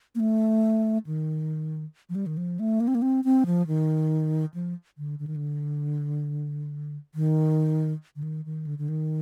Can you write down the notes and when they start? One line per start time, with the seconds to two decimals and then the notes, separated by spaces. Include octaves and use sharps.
0.15 A#3
0.20 A3
1.06 D#3
2.09 F3
2.15 G3
2.26 D#3
2.37 F3
2.59 A3
2.80 A#3
2.88 C4
2.95 A#3
3.02 C4
3.24 C4
3.46 F3
3.67 D#3
4.54 F3
4.98 D3
5.19 D3
5.27 D#3
5.36 D3
7.15 D#3
8.16 D3
8.23 D#3
8.45 D#3
8.66 D3
8.78 D3
8.89 D#3